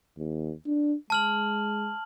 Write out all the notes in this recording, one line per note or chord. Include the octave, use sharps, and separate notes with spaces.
D#2
D4
G#3 A5 F6 F#7